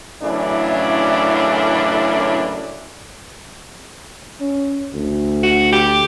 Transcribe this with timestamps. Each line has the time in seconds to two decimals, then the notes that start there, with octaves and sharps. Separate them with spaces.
0.22 F#2 A2 C#3 E3 C#4 D4
4.41 C#4
4.94 D2
5.43 F#4
5.73 G4